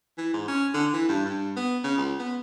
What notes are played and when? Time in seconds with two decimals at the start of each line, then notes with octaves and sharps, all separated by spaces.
0.18 E3
0.33 G#2
0.48 C#4
0.74 D3
0.93 E3
1.09 G2
1.25 G2
1.56 B3
1.84 C#3
1.98 C#2
2.19 B3